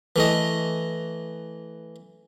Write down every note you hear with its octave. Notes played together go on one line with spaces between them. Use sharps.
E3 A3 D#5